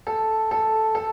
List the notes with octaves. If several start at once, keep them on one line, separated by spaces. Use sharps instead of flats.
A4
A4
A4